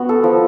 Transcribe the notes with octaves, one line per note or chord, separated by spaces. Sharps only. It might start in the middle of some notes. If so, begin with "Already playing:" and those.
Already playing: B3 F#4
A4
F3